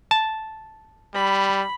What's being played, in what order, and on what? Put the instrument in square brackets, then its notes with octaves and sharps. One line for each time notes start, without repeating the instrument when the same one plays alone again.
[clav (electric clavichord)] A5
[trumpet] G3 [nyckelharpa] B5